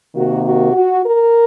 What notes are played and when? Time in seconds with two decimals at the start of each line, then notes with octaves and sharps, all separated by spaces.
0.14 C3 D#3 A#3 F#4
0.44 F#4
0.74 F#4
1.04 A#4